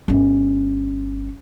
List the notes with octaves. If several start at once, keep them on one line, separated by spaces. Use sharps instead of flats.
G1 C#4